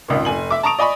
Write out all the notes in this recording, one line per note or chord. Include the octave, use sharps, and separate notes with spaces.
G#1 C#2 A#2
F1 G#5 F#7
E5 D6
A5 A#5 C#6 D#6 D7 F7
D5 D#5 G#5 B5 C#6